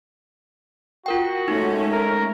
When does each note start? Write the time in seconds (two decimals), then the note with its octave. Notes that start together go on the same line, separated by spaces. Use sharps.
1.06 F4 F#4 A#4 G5
1.48 G#3 A3 C#4 D#4
1.92 A#4